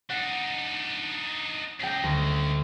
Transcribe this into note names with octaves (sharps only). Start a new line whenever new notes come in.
D4 D#4 F#5
C#2 G5 A#6 C7
D2